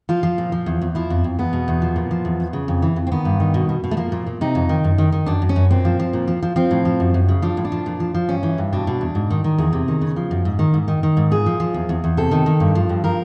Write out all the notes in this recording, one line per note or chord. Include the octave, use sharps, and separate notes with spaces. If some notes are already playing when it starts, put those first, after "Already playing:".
F3 F4
F3
A#2
F3
E2
E2
F3 E4
F2
F2
E2 B3
B2
E2
F3
A#2
F3
E2
E2
C#3
F2
E3
F2
C4
D#3 B3
G2
D#3
B2
B2
B2
A3
F3 A#3
A#2
A#2
C3 D#4
F2
D#3
F#2
D#3
D#3
F#2 D4
F#2
C#4
F#2
A#2 C4
F3
F3
A#2
F3
F3
F3 C4
A2
F3
F#2
F#2
C#3
F3 D4
A2
D4
F3
A#2
F3
F3
G2 C#4
E3
G2
B2 D4
B2
E2
G#2
D#3
D#3
E2 G#4
C3
D#3
C#3
F3
F#2
G#2
D#3
G#2
D#3
D#3
G#2
A#2 G#4
F3
F3
E2
E2
E2
C3 A4
D#3
D#3
G2
F3
G2
F3 A#4